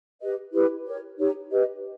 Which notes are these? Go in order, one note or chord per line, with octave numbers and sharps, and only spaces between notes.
G4 B4 D#5
E4 G4 B4
G4 A#4 C#5
D#4 G4 C#5
G4 B4 D#5